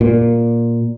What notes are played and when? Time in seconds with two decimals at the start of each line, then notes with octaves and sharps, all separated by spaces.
0.01 A#2